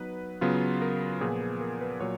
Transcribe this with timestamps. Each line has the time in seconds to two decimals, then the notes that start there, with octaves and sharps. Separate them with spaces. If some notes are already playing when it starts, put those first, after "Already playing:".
Already playing: F#3 B3 D#4 B4
0.41 C#3 F#3 B3 F4
0.82 A#4
1.21 A#2 F3 B3 G#4
1.41 G#4
1.61 A#4
1.81 B4
2.00 A#2 F#3 C#5